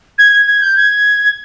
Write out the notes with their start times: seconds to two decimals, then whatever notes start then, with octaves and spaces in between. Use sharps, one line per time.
0.18 G#6
0.32 G#6
0.47 G#6
0.61 G6
0.76 G#6